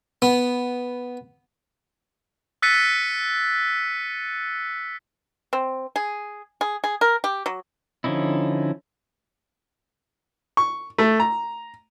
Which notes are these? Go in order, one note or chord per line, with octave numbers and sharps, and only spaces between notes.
B3
E6 F#6 A6 B6 C#7 D#7
C4
G#4
G#4
G#4
A#4
G4
F#3
D3 F3 C#4 D#4 E4
C#6
A3
A#5